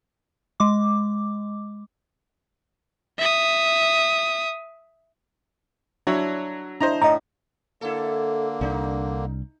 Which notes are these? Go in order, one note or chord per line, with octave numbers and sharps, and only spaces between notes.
G#3 D6
E5 D#6
F#3 D4 E4 C#5
D4 E4 C5 D#5 A#5
A2 D#5 A#5
D3 A#3 E4 A4
C2 D4 D#4